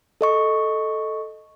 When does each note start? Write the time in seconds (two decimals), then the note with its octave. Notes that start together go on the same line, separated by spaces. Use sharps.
0.21 A4 D#5 C#6